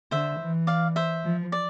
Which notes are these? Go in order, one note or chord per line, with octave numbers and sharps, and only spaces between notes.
D3 C5 E5
E3
D5 F5
C5 E5
F3
D5